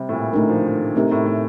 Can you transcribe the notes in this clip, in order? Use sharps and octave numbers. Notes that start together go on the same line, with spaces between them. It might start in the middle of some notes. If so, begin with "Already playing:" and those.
Already playing: C3 G3
A2
A#2
D3 A3 D#4 A#4
F3
D#3
C3 A3 C4 D#4 G4 A#4
A2
A2